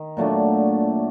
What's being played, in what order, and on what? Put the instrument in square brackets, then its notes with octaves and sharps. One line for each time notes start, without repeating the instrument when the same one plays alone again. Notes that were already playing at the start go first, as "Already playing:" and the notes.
Already playing: [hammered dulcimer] D#3
A#2 F#3 A3 D4